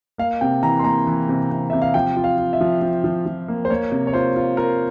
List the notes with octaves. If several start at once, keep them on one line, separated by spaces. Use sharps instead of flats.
A#3 F5
C3 G5
E3 A#5
C6
A#3 A#5
E3
C3
C3
C3 E5
F5
F3 G5
F4
F5
F4
E5
F3
F3
F3
F3
A#3
C5
A#3 C#5
C3
C#5
F4 C5
F4
F4 A#4